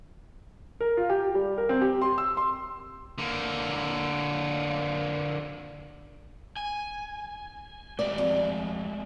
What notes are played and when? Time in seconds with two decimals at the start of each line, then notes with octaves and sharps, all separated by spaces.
0.81 A#4
0.97 F4
1.10 G4
1.35 G3
1.58 A#4
1.69 C4
1.81 G4
2.02 C6
2.18 E6
2.37 C6
3.18 D3 A#3
6.56 G#5
7.99 G#3 A3 G4 D5
8.18 F2